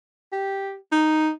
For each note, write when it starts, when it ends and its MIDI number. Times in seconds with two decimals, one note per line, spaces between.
0.32 0.74 67
0.92 1.30 63